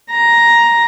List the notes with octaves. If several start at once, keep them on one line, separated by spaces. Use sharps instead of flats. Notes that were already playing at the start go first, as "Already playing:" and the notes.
A#5